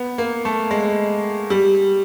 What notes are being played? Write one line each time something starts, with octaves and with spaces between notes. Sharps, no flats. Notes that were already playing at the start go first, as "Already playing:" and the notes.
Already playing: B3
A#3
A3
G#3
G3